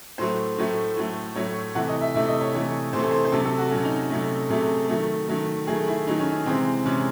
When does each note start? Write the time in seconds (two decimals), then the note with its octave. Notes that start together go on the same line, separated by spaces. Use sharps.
0.18 A2 F#3 A3 C5
0.58 A2 F#3 A3
0.97 A2 F#3 A3
1.36 A2 F#3 A3 C#5
1.75 C3 E3 A3 F#5
1.88 D#5
2.01 E5
2.14 C3 E3 A3 E5
2.28 D#5
2.41 C#5
2.53 C3 E3 A3 C#5
2.93 C3 E3 A3 C5
3.02 A4
3.11 C5
3.25 C5
3.32 C3 F#3 A3 A4
3.45 A4
3.58 F#4
3.71 C3 F#3 A3 C#4
3.85 D#4
4.10 C3 F#3 A3
4.50 C3 F#3 A3 G#4
4.89 D#3 F#3 A3
5.29 D#3 F#3 A3
5.67 D#3 F#3 A3 G#4
5.88 E4
6.07 D#3 F#3 A3 D#4
6.20 C#4
6.33 C#4
6.46 C3 E3 G#3 C4
6.85 C3 E3 G#3 C#4